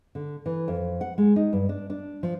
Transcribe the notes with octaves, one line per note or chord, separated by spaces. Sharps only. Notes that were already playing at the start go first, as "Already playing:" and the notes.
D3
E3
F2
F#5
G#3
D#4
G2
D4
D4
F3